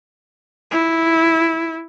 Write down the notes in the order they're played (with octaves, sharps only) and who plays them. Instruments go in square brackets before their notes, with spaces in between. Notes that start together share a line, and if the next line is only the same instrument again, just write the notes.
[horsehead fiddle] E4